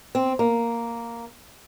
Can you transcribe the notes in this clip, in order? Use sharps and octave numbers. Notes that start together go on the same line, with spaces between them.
C4
A#3